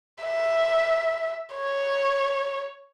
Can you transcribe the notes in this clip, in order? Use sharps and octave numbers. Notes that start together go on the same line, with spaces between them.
E5
C#5